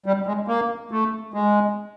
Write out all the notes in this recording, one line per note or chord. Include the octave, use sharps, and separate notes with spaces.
G3
G#3
A#3
A3
G#3